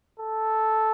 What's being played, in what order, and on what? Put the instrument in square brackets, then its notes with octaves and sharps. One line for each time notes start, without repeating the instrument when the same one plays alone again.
[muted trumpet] A4